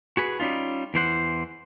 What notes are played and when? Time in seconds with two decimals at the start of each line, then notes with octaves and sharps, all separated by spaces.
0.17 F#4 G#4 B4
0.40 G3 C#4 D#4 F4
0.94 E2 E3 C5 F#5